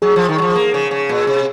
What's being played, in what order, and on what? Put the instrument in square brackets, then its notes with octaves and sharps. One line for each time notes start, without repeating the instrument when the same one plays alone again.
[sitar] F#3 [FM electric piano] G#4
[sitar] F3
D#3
F#3
F3
A#3
C#3
C#3
A#2
C3